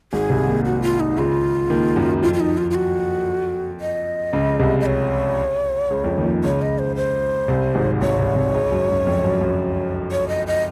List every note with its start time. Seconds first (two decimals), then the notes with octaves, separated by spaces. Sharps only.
0.13 G#1 G#2 G#4
0.30 C2 C3
0.47 D#2 D#3
0.65 F#4
0.82 F4
1.00 D#4
1.17 C#2 C#3 F4
1.70 D#2 D#3
1.96 F#2 F#3
2.23 F2 F3 F4
2.34 F4
2.40 D#4
2.58 F4
2.71 F4
2.75 F#4
3.81 D#5
4.33 C#2 C#3
4.59 C2 C3
4.80 D#5
4.86 C#5
5.91 C#2 C#3
6.04 F2 F3
6.18 D#2 D#3
6.25 F3
6.30 D#2 D#3
6.43 C#2 C#3 C#5
6.62 D#5
6.79 C5
6.96 C5
7.48 C2 C3
7.75 G#1 G#2
8.01 G#1 G#2 C#5
8.19 C2 C3
8.36 C2 C3
8.54 C#2 C#3
8.72 F#2
8.89 F#2
9.07 F2
9.24 F#2
9.41 F#2
10.12 C#5
10.29 D#5
10.47 D#5